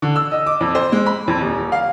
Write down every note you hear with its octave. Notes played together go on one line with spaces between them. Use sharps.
D3
E6
D#5
D6
F2
C5
G#3
B5
F2
D#1
F5